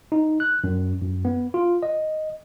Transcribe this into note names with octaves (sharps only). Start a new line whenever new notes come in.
D#4
F#6
F#2
F#2
B3
F4
D#5